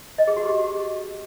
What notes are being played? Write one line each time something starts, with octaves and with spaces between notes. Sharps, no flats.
D#5
G#4
F#4
G4